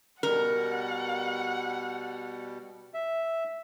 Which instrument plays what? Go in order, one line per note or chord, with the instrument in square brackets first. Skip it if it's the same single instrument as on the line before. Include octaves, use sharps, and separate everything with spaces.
[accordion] B2 G3 [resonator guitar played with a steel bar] A#4 [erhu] F#5
[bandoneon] E5